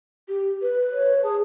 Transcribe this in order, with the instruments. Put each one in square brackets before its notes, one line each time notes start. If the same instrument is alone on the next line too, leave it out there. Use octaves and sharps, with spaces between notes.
[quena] G4
B4
[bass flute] C#5
[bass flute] G#4 [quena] A5